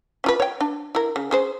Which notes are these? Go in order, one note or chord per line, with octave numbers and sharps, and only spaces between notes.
C#4 F4 B4
C#5 G5
D4
E4 A#4
C#3
C#4 G#4 C5